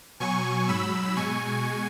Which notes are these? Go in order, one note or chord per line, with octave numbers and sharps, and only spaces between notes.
B2 F#3 G#5 C#6
G#2 F#3 B5 E6
B2 G#3 G#5 C#6